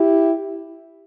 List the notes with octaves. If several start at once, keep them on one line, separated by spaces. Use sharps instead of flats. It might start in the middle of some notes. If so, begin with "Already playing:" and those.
Already playing: E4 G4